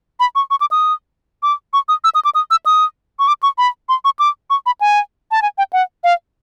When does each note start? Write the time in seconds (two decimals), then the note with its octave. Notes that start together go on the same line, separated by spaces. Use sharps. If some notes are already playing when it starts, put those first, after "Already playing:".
0.20 B5
0.35 C#6
0.51 C#6
0.61 D6
0.71 D#6
1.43 D6
1.73 C#6
1.89 D#6
2.04 E6
2.15 D#6
2.25 D6
2.35 D#6
2.51 E6
2.66 D#6
3.19 C#6
3.28 D6
3.43 C#6
3.58 B5
3.89 C6
4.05 C#6
4.19 D6
4.50 C#6
4.66 B5
4.81 G#5
5.31 A5
5.42 G#5
5.58 G5
5.73 F#5
6.04 F5